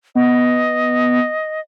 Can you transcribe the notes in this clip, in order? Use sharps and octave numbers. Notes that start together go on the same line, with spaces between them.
B3 D#5